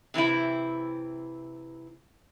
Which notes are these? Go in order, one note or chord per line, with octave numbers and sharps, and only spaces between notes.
C3 E3 C4 E4